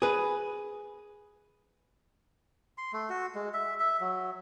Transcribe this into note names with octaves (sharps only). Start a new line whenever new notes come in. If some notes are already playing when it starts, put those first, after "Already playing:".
G#4 B4
C6
A3
F#4
G#3
E5
E5
F#3